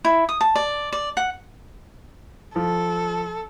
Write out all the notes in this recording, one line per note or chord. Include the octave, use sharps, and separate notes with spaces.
E4
D#6
A5
D5
D5
F#5
F3 A4